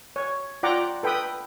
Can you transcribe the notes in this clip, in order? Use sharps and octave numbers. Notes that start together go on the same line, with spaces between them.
C#5
F4 D5 F#5 G5 A#5 D6
A4 B4 G5 B5 D#6